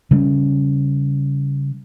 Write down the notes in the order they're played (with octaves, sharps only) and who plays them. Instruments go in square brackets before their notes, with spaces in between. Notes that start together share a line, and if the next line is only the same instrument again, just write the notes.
[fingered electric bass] C#3 G3 C#4